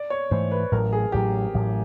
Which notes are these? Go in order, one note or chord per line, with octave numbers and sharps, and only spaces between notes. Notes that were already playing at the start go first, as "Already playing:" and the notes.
Already playing: D5
C#5
G#2 E3 A3 C5
B4
A1 A2 F#3 A#4
G#4
A1 A2 F#3 G4
A1 A2 F#3